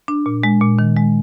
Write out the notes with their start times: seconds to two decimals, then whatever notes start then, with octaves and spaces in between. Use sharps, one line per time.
0.08 D4
0.26 A#2
0.43 G#3
0.61 A#2
0.79 D#3
0.96 G#3